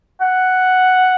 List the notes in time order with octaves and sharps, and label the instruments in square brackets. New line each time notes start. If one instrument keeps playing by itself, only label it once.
[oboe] F#5